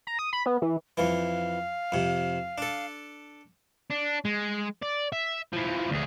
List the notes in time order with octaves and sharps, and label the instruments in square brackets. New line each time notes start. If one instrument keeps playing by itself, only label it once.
[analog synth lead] A#5
D#6
B5
B3
E3
[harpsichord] F2 E3 [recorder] F5
[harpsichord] F2 C3
D4 A4
[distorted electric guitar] D4
G#3
D5
E5
E3 F3
D2 G#4